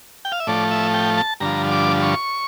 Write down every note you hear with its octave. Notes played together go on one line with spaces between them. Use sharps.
G5
F5
E5
A2 F3 A3 D5
E5
G5
A5
G2 D3 F3 A#5
D6
C#6